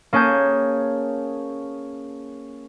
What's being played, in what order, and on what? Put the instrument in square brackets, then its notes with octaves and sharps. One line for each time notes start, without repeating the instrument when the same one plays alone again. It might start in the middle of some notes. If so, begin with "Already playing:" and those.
[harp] A#3 C#4 G#4 A5 G6